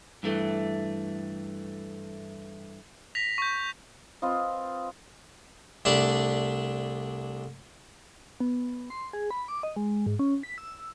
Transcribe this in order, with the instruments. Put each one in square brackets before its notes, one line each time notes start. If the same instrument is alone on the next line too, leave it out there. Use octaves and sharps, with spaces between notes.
[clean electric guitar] G2 E3 A3
[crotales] A#6 B6 F7
C#6 G6
[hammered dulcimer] C4 F4 B4 D#5
[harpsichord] C2 A3 D4 D5 B5
[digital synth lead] B3
C6
G#4
B5
D6
D#5
G#3
G#2
C#4
B6
E6